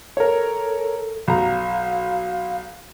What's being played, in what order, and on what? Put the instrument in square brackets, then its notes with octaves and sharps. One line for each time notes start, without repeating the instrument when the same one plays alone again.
[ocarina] A4 [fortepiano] A#4 C#5
[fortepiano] B1 A#5 [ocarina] F5